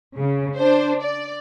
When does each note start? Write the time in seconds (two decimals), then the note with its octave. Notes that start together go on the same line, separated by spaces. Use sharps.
0.18 C#3
0.57 D4 C5
1.01 D5